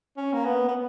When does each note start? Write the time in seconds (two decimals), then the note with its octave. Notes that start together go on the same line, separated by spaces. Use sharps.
0.17 C#4
0.34 A#3
0.45 B3
0.68 B3